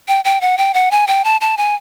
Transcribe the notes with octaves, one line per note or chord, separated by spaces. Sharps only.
G5
G5
F#5
G5
F#5
G#5
G5
A5
A5
G#5